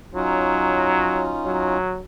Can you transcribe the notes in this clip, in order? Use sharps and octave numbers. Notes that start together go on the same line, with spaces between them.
F#3 C#4 D#4 F4
F#3